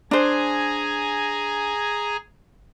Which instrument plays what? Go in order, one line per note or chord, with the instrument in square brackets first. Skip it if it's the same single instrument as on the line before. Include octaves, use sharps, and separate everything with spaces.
[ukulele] D4 C5 [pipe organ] G#4 G#5 A#5